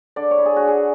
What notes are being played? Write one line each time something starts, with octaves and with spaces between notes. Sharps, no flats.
D3 D5
C#5
E4
G#4
D3 F#4
G#4